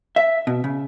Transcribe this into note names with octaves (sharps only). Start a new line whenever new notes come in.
E5
B2
C#3